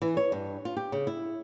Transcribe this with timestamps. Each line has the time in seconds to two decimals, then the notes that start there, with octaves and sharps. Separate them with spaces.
0.02 E3
0.17 C#5
0.32 G2
0.65 F4
0.77 G4
0.92 C#3
1.07 E4